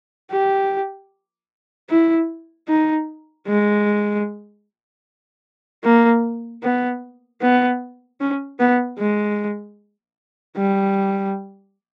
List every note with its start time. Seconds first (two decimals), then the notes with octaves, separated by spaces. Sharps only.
0.31 G4
1.89 E4
2.68 D#4
3.47 G#3
5.84 A#3
6.63 B3
7.41 B3
8.20 C#4
8.59 B3
8.99 G#3
10.56 G3